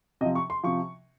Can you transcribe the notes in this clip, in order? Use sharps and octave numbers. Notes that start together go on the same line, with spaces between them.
C3 F3 D#5
C#6
C6
C3 F3 C#6